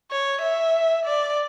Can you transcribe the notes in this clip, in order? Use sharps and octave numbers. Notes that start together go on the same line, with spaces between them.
C#5
E5
D5